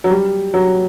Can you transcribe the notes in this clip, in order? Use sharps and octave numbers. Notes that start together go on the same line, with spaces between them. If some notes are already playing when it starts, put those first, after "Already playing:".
F#3
G3
F#3